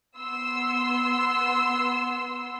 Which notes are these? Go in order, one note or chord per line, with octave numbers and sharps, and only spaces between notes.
B3 C6 E6